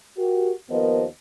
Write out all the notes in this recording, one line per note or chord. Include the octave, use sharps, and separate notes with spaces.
F#4 G4 A#4
D#2 F3 B3 A#4 C5 D#5